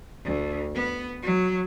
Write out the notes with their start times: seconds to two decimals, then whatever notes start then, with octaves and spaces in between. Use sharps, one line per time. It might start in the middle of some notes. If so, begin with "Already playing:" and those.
0.24 D2
0.74 B3
1.23 F#3